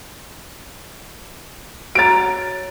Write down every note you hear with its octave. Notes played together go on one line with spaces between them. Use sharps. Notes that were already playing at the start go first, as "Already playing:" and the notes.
F#4 C#5 A#5 A6 D7